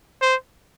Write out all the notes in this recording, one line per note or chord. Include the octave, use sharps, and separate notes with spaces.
C5